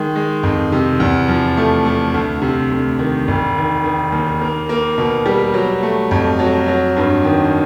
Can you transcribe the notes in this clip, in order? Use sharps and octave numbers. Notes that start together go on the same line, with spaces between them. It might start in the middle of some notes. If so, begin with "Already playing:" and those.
Already playing: D#3 G#3
G#3
F2
C3
E2
F3
A3
A3
D2
C3
D2
D#3
E1
D#3
D#3
D#2
A#3
A#3
B2
G3
F#3
A3
F2
F#3
F#3
G2
D#3